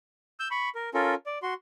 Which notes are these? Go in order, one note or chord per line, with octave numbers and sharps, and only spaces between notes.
E6 G6
B5 C#6
A#4
C#4 F4 A4 A#4
D5
F#4 C6